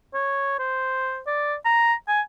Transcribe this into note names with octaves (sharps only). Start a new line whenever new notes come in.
C#5
C5
D5
A#5
G#5